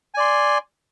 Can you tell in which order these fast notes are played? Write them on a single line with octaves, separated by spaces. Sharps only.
G#5 D5 C6